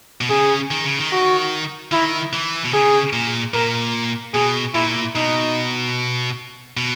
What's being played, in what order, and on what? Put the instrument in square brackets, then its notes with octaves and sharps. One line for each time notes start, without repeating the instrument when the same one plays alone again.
[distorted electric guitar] B2
[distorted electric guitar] C#3 [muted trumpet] G#4
[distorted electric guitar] D#3
C#3
D#3
[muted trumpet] F#4
[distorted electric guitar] D#3 [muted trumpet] E4
[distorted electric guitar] E3
B2
[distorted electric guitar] C#3 [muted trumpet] G#4
[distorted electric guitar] A#2
[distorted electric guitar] A#2 [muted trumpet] A#4
[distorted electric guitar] B2 [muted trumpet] G#4
[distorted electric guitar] A#2 [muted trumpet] E4
[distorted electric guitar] B2 [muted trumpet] D#4
[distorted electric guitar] B2